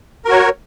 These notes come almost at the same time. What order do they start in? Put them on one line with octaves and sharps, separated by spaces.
A#4 F#4 C#5